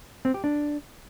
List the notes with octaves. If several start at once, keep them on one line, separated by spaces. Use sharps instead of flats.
C4
G4
D4